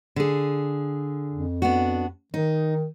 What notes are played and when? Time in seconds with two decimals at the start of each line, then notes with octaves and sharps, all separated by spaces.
0.16 D3 G#4
1.32 F2
1.62 B3 D4 F#4
2.34 D#3 D#4